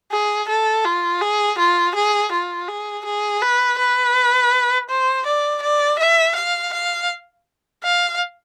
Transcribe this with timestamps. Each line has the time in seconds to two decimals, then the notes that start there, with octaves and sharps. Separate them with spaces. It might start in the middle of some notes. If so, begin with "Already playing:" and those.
0.12 G#4
0.49 A4
0.85 F4
1.21 G#4
1.58 F4
1.95 G#4
2.32 F4
2.68 G#4
3.05 G#4
3.42 B4
3.78 B4
4.89 C5
5.26 D5
5.62 D5
5.99 E5
6.36 F5
6.73 F5
7.84 F5